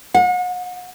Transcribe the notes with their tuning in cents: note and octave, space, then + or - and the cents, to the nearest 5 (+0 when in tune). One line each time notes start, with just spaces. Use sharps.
F#5 -40